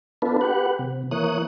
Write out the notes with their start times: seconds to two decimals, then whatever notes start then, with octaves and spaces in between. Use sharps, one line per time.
0.22 B3 D4 F4 A4 B4
0.41 G4 B4 F#5
0.79 C3
1.11 E3 A#3 C#5 D#6 F#6